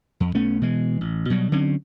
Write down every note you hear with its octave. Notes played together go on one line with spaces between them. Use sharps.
F2
B1 A3 B3 C#4
B2 E3 G#3
A1
B2 F#3 G3
D3 F#3 C4 C#4